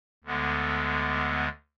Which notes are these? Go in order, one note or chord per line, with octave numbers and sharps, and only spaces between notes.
D2 D3 G#3 B3